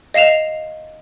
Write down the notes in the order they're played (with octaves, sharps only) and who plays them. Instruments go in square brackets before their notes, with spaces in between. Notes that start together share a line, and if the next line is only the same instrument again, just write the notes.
[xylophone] D#5 F5 C7 E7 F7